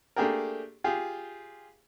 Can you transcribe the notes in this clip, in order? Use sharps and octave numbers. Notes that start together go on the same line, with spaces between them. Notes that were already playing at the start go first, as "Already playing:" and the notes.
A3 A#3 D4 G4 G#4 A#4
F4 G4 G#4